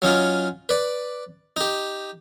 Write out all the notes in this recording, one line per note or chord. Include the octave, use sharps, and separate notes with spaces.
F#3 C#4 D#4 F4
B4 D5
D#4 G4